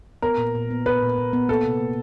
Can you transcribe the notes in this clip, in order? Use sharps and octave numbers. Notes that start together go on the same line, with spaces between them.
B3 A#4
A#2
A#2
B3
B3 B4
A#2
A#2
B3
A#3 A4
C3
A#3